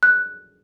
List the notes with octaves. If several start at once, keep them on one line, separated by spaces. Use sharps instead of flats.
F#6